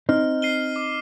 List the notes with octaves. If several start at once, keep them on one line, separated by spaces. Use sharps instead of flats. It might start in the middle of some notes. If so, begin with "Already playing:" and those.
C4 D#4 F6
C7 D#7 G7
D6